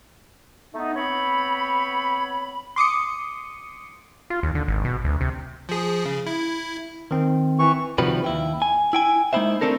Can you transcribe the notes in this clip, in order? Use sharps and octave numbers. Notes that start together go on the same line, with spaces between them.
A3 B3 D#4
B3 C4 C#5 B5
C6 D6 D#6 C#7
F4
D#2
D3
G#1
B2
D2
C3
F3 G#4
C#3
E4
D#3 C4
E3 C#6
C3 D#3 F3 G3 F#4 B4
D#2 E4 G5
G#5
E4 G5 G#5
G#3 A#3 D#4 E4 C5 E5
A3 A#3 C4 D4 A4 A#4